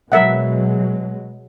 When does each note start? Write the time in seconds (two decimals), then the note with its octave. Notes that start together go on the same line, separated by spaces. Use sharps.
0.12 B2 F#3 G#3 A#4 E5 F#5